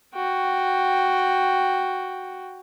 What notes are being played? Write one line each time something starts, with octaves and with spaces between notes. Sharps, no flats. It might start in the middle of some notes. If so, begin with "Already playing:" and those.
F#4 G5